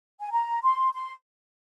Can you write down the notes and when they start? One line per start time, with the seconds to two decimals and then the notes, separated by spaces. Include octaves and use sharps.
0.21 G#5
0.31 A#5
0.62 C6
0.93 C6